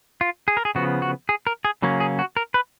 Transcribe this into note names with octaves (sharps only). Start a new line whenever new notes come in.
F4
G#4
A#4
G#4
C#3 F3 B3 F#4
F#4
G#4
A#4
G#4
C#3 F#3 A#3 C#4
G#4
F#4
A#4
B4